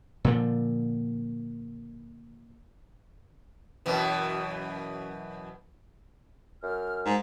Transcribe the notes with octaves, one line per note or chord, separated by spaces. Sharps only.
A#2 D3 F3
F#2 B2 E3
F#2 F6
G#2